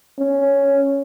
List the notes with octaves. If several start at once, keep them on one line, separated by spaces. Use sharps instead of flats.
C#4